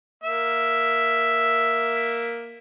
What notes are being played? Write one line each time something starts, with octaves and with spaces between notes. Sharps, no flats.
A#3 E5